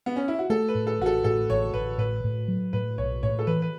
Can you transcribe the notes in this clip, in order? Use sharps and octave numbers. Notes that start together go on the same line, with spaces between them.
B3
C#4
E4
F#4
A3 A4
B4
A2
A4
A1 F#4
A4
A2 A4
A1 C#5
A1 B4
A2 B4
A2
F#3
A2 B4
B1 C#5
A2 C#5
A4
E3 B4
B4